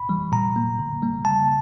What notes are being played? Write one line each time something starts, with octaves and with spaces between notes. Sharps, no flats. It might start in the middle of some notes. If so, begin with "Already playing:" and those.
Already playing: B5
E3 G3
A#2 A#5
F#3 A#3
D3
G3 A#3
C#3 A5